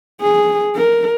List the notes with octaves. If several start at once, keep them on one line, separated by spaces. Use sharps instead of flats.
G#4
A#4